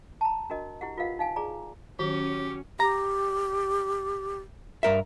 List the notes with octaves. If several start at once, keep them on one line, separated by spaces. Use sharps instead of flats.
A5 A#5
D4 F#4 A#4 D#5
E4 G4 F#5
F4 A#4 B4 D#5 F5 F#5
D#4 F5 G#5
G#4 D5 A#5
D#3 F#3 C#4 G4
G4 A#5
G2 A#4 E5